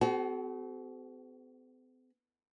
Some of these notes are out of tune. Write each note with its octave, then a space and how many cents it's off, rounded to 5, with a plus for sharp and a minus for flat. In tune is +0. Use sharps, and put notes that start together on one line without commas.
C4 -45 F#4 +25 A4 -45